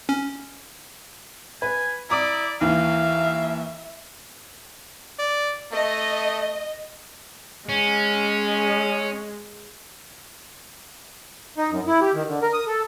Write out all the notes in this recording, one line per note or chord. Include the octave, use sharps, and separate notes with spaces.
C#4
B4 G#5
E4 D5 A#5 D6 D#6
D#2 E3 E5 F5
D5
A3 D#5
G#3 C#4
D#4
F#2
E4
G4
D#3
D3
A#4
D#6
A4